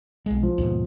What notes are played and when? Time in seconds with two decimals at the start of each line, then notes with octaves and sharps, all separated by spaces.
0.26 B1 G#3
0.43 F3
0.58 D#2 G#2 B2